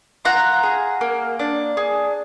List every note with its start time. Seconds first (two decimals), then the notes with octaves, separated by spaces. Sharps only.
0.25 F4 F#5 A#5
0.63 G#4
1.01 A#3
1.39 D4
1.77 G#4